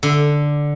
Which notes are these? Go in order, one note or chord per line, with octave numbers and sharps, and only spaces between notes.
D3